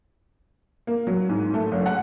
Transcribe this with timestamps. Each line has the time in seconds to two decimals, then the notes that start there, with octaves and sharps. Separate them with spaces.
0.87 A#3
1.07 F#3
1.29 G#2
1.54 A3
1.72 F#1
1.86 F#5